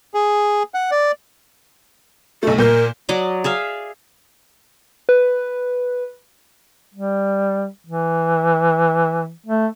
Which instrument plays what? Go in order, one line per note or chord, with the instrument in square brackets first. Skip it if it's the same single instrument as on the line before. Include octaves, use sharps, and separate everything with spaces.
[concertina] G#4
F#5
D5
[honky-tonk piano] B1 A3 [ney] A4
[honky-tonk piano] A#2 G6 [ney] A#4
[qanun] F#3 D5 D#5 D6
G#4 E5 F5
[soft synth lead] B4
[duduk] G3
E3
A3